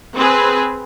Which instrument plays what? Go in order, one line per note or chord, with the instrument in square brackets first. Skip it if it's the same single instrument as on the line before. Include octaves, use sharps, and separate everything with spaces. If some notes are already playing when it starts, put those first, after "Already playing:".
[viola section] C4 G#4 B4